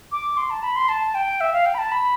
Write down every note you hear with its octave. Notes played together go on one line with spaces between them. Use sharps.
D6
C6
A5
B5
C6
A5
G5
E5
F5
G5
B5
A5
B5